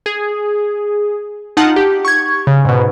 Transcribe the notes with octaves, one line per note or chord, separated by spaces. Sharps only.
G#4
D#4 F4 F#5 A5
G4
C#6 G#6
C#3
G#2 B2